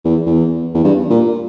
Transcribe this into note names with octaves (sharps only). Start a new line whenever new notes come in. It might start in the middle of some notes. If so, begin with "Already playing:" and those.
E2
E2
E2
G2
A#2